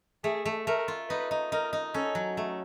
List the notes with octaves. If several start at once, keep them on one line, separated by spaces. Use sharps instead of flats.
A3 G#4
A3
A3 A#4
F4
D#4 B4
D#4
D#4 A#4
D#4
C#4 A4
F#3
A3